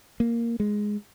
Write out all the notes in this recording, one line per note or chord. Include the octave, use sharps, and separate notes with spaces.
A#3
G#3